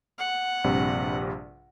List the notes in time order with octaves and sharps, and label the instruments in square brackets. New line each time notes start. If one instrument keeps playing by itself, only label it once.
[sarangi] F#5
[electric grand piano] A#1 G2 C3